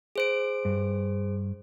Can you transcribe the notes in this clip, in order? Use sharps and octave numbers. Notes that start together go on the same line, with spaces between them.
G#4 C5 D7
G2